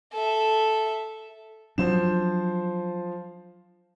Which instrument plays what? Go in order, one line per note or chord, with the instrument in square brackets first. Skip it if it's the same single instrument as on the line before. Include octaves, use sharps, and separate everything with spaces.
[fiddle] A4 E5
[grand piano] F3 C5 E7 [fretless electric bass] F#3 D4